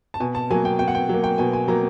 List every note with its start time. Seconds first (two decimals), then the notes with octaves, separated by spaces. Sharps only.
0.14 A5
0.20 B2 G#5
0.35 A5
0.51 F#3 A#3 G#5
0.65 G5
0.79 B2 G5
0.88 F#5
0.95 G5
1.09 F#3 A#3
1.24 G5
1.38 B2 G#5
1.53 G#5
1.68 F#3 A#3 A#5